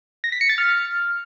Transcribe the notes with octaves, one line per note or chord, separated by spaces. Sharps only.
A#6
B6
C#7
A6
F6